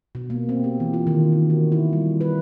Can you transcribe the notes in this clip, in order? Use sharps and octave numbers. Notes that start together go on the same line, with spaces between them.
B2
A#3
C4
G4
E3
F4
D#3
D#4
F#4
E4
G3
B4